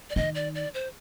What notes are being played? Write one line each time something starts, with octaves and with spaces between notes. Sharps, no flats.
D5
D#3 D#5
D5
D5
C5